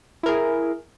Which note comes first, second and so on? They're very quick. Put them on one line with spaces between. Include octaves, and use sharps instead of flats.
E4 A#4 G#4